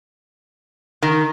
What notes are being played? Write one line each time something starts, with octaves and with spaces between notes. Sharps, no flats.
D#3